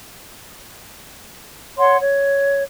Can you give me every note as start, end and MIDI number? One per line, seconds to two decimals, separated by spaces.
1.78 1.97 73
1.78 1.97 78
1.78 1.97 84
2.00 2.63 73